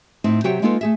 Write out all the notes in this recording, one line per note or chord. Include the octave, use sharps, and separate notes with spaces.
A2 C4 D#4
C3 F#3 F#4 G4 C#5 G5
G#3 A#3 D#4 F4 A4 B4
A3 G#4 E5